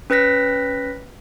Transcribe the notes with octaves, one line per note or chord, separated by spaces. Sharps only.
C#4 B4 F#6 A#6 B6